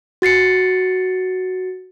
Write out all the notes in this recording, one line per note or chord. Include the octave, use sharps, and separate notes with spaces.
F#4 A6 C7 C#7